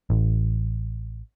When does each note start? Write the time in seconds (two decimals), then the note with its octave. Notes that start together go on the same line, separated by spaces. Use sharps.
0.10 A1